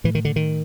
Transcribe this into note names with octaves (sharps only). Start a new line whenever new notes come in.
A2 E3
D#3
D3
D#3